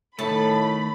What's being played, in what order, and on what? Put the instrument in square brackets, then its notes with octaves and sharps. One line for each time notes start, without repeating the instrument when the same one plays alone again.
[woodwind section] A2 [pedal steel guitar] D#3 A3 [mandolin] A5 [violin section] B5